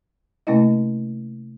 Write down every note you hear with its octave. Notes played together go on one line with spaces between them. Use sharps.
C3 A3 A#3 C#4 E4 D#5